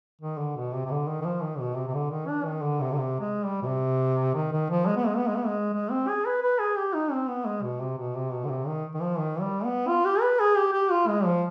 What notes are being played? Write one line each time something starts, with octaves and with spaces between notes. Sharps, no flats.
D#3
D3
B2
C3
C3
D3
D#3
D#3
F3
D#3
B2
C3
C3
D3
D#3
D4
D#3
D3
C3
D3
C3
G#3
G3
B2
C3
D#3
D#3
F3
G#3
B3
G#3
B3
G#3
B3
G#3
G#3
C4
G#4
B4
B4
G#4
G4
D#4
C4
B3
G#3
B2
C3
B2
C3
B2
D3
C3
D#3
D#3
F3
D#3
G3
B3
F4
G4
B4
G#4
G4
G4
F4
G#3
F3